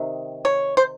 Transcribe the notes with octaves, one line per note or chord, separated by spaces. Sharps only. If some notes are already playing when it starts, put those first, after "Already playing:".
Already playing: C3 D#3
C#5
C5